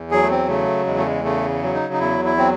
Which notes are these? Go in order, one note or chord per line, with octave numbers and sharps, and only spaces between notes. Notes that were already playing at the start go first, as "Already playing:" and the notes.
Already playing: E2
F#3 G#4
A3
C4
C#3 A3
E2 G#3
A3
G#3
C#3 A3
F#3
D#4
D#4
E2 E4
E4
F#3 C4